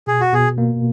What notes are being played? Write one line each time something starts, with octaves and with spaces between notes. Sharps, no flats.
B2 G#4
F#4
B2 G#4
A#3